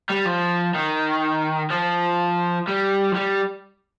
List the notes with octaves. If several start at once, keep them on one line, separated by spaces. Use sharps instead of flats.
G3
F3
D#3
F3
G3
F3
G3